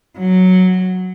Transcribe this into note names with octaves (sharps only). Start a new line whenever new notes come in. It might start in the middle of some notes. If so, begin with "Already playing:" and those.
F#3